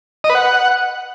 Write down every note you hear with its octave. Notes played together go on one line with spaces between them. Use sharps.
D#5
B4
F#5